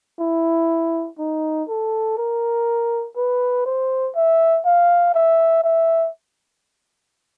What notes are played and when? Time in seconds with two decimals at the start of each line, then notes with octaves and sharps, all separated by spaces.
0.20 E4
1.19 D#4
1.69 A4
2.18 A#4
3.17 B4
3.66 C5
4.16 E5
4.65 F5
5.15 E5
5.64 E5